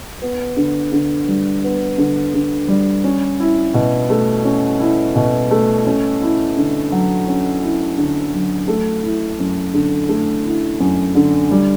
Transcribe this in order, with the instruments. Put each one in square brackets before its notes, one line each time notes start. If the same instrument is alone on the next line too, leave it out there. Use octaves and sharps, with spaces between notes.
[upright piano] B3
D3
D3
G3
B3
D3
D3
G3
C#4
E4
B2
A3
C#4
E4
B2
A3
C#4
E4
D3
F#3
C#4
E4
D3
F#3
A3
E4
F#2
D3
A3
E4
F#2
D3
G3